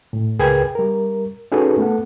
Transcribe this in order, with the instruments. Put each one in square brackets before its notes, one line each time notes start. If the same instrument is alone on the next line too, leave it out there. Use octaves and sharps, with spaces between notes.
[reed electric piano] A2
C#2 G#4 A#4 B4 G5 G#6
G3 A#4
C#4 D#4 F#4 G#4 A4 B4
A3 B3 A4 F#5